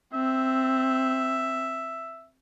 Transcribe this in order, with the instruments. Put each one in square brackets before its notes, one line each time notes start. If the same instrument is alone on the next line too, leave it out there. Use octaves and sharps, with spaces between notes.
[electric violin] C4 [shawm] E5